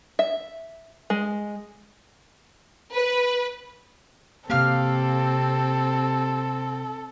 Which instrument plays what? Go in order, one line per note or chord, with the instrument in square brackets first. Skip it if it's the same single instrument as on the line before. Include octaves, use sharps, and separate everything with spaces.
[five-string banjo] E5
G#3
[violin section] B4
[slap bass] C3 A#3 [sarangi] C4 [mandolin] G4 F5 F6 [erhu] A4